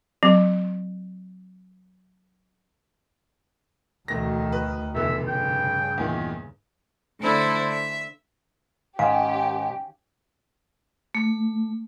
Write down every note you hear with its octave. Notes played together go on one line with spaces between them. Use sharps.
F#3 C4
E1 D2 D#3 A3 A#6
B4
F1 E2 B2 D3 E4 E5
G2 C#3 G5
E2 A#2 D#3
D3 A3 D4 E4 A4 C5
E5
G#2 D#3 C#4 G4 F5
A3